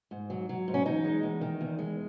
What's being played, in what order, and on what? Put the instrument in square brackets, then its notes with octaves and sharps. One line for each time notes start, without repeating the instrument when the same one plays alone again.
[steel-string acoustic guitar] G#2
F#3
F#3
G#2
C#4
E2 D#4
G#3
E2
D#3
E2
G#3